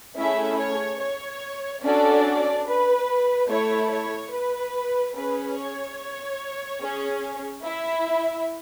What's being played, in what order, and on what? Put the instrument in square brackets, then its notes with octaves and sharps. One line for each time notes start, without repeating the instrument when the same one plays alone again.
[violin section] A3 C#4 E4 G#4 E5
C#5
C#5
C#4 D4 F#4 A4 D5
B4
A3 E4 A4 C#5
C#5
B4
C#4 G#4 B4
C#5
C#4 G#4
E4 E5